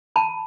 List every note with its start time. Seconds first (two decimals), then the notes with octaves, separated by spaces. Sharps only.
0.16 A5 B5